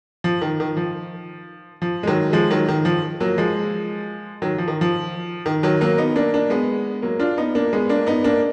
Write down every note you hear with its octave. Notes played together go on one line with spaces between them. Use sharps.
F3
D#3
D#3
F3
F3
G#3
D#3 F#3
F3 G#3
D#3 F#3
D#3
F3
F#3 A#3
F3 G#3
D#3 F#3
F3
D#3
F3
D#3
D#3 F#3
F#3 A#3
B3 D#4
A#3 D4
A#3 D4
G#3 B3
F#3 A#3
D4 F4
B3 D#4
A#3 D4
G#3 B3
A#3 D4
B3 D#4
A#3 D4